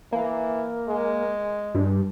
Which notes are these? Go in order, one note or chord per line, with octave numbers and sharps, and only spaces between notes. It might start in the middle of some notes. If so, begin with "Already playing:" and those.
E3 A#3
G#3
G2